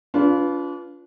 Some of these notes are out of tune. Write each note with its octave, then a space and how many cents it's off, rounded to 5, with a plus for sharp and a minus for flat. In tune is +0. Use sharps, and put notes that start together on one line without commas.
D4 -40 F4 +0 B4 +0